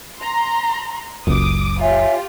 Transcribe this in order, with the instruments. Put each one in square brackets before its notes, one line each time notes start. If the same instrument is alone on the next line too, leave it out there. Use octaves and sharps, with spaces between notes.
[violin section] A#5 C6
[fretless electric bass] F#1 C#2 F#2 [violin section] D6 D#6
[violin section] F4 G4 [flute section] C#5 E5 G#5